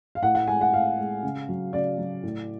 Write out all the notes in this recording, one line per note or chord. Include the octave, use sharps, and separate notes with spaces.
F5
A2 F#5
F#5
G#3 G#5
F#5
A2 F5
G#3
C#3
F#3
C#3 D5
F#3
A2